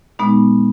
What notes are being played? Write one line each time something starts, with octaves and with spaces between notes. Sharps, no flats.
A#2 G#3 B3 D#4